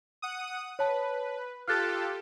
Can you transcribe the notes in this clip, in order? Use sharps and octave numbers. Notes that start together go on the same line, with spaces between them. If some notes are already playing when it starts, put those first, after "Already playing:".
F#5 D#6
B4 C#5 A5
F4 G4 A4 F6 F#6 A6